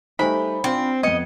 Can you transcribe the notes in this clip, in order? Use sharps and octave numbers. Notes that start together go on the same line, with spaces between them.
G3 A3 D#4 C5 G#5 B5
C4 D4 F4
F2 B3 D#5 G#6 C#7